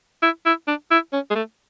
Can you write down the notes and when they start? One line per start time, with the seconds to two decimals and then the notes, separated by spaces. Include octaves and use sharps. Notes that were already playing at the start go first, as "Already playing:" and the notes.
0.23 E4
0.46 E4
0.67 D4
0.91 E4
1.13 C#4
1.30 G#3
1.35 A3